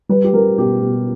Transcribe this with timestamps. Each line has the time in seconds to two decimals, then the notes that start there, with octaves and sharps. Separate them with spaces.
0.09 G3 B4
0.24 G4
0.34 G3 A#4
0.58 B2 G4
0.83 B2